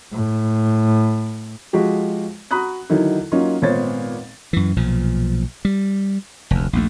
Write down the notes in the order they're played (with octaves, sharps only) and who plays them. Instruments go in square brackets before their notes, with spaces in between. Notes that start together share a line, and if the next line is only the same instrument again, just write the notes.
[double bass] A2
[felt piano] F3 G#3 F#4 G4
F#4 A#5 B5 D#6 F#6
D3 D#3 F#3 D#4 E4
F#3 A#3 C#4 D#4 F4
G#1 A#2 B3 C5 C#5 A6
[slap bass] F#2 E3
B1 A#2 F3
G3
F1 D2
A#1 D#2 A3